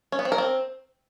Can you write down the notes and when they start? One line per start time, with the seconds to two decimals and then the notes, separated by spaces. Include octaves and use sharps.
0.12 C#4
0.19 B3
0.25 C4
0.32 A#4
0.38 C4